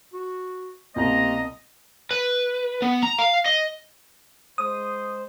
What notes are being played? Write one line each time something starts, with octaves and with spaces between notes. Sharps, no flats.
F#4
C2 B2 A#3 G4 C5 D#5 A#5
B4
B3
A#5
F5
D#5
G#3 C5 D#6